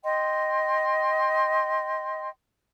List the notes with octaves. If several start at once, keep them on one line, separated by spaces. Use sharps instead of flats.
D#5 G5 C6